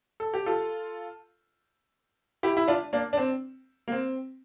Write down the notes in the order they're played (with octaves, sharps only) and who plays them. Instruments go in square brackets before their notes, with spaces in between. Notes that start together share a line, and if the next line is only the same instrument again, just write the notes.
[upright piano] A4
G4
F4 A4
E4 G4
E4
D4 F4
A#3 D4
D4
C4
A#3
C4